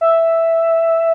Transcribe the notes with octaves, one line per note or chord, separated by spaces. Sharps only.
E5